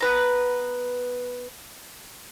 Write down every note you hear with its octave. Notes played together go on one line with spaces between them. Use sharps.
B3 B4 A#5